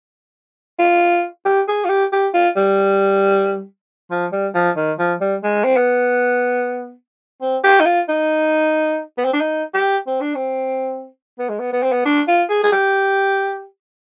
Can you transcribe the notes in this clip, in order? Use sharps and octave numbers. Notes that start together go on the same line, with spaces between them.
F4
G4
G#4
F4
G4
G4
F4
G3
F3
G3
F3
D#3
F3
G3
G#3
C4
B3
C4
G4
D#4
F4
D#4
B3
C4
D4
D#4
G4
C4
D4
C4
B3
G#3
B3
B3
C4
B3
D4
F4
G#4
G#4
G4